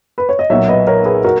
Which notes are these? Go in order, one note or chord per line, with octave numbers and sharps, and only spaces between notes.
B4
C#5
D#5
B1 A#2 F#3 C#5 E5
B4 D#5
A#4 C#5
G#4 B4
F#4 A#4